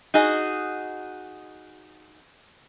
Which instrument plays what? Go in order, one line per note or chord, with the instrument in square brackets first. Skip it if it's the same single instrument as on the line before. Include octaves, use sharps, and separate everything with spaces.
[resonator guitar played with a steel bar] D#4 F#4 G#4 D#5